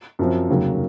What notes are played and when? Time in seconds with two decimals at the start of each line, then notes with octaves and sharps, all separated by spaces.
0.19 F#2 F3 C4
0.49 F1 D#2 C#3 F#3 A#3